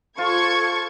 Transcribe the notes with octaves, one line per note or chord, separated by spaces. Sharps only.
F4 A4 C5 C#6 G#6